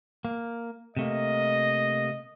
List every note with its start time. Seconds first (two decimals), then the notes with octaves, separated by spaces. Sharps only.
0.25 A#3
0.97 C3 A3 A#3 D#5